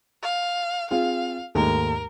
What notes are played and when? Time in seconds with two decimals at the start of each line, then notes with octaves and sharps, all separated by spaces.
0.23 F5
0.91 C4 F4 G#4 F5
1.55 D#2 G#2 A3 A#4